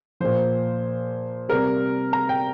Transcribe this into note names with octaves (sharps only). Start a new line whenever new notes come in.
A#2 F3 C5
C3 G3 A#4
A#5
G5